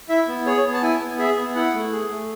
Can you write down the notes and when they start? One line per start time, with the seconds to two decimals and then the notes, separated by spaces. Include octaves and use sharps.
0.09 E4 E5
0.28 B3
0.46 G#4 C#5
0.64 B3
0.73 A5
0.83 E4 G#5
1.00 B3
1.18 G#4 E5
1.37 B3
1.55 E4 F#5
1.74 A3
1.92 G#4
2.10 A3